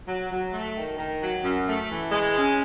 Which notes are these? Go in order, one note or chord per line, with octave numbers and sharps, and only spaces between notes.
F#3
F#3
A3
D#3
D#3
F#3
F#2
A3
E3
G#3
C#4